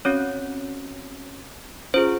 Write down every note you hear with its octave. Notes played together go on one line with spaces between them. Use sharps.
C4 C#4 F#4 C#5
C#4 F4 G#4 C5